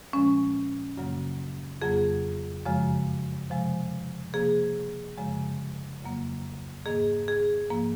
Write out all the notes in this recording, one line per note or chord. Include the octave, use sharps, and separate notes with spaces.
A#2 F3 G#3 C#4
F#2 C#3 F#3 A#3
F2 C#3 F#3 A#3 G#4
F#2 C#3 F3 G#3
C3 F3 G#3
C3 F3 A#3 G#4
F#2 C#3 F3 G#3
F2 C#3 F#3 A#3
G#2 D#3 A#3 G#4
G#4
G#2 F3 A#3